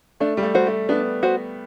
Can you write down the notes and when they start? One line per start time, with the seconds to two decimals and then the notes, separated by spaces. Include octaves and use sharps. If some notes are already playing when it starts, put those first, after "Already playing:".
0.20 A3 D4
0.37 G3
0.43 A3
0.55 F#4 C5
0.67 A3
0.89 B3 D4
1.23 F#4 C5